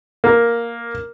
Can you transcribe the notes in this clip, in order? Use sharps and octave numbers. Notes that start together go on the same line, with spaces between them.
A#3